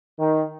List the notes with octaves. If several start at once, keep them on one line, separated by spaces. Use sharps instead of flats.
D#3